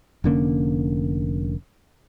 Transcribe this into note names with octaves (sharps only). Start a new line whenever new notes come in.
F1 D3 A#3 C#4